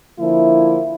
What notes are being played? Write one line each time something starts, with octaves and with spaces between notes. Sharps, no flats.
D3 F3 A#3 E4